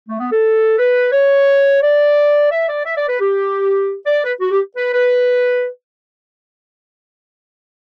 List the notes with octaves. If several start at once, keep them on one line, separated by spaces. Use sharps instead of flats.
A3
B3
A4
B4
C#5
D5
E5
D5
E5
D5
B4
G4
D5
B4
F#4
G4
B4
B4